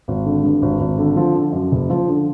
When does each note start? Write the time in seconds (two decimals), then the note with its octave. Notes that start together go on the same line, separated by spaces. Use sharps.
0.08 G#1
0.26 D3
0.44 G2
0.62 G#1
0.80 G#1
0.98 D3
1.16 F3
1.35 D3
1.52 F#2
1.72 F#1
1.90 F3
2.08 D3